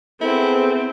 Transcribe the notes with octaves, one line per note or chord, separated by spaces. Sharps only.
B3 C4 E4 G#4 A4